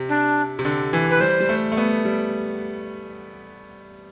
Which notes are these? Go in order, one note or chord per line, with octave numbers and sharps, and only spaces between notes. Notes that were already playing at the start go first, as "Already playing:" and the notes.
Already playing: C3
D4
C3
D3
E3
B4
G3 C5
G3
A3
A3
B3
G3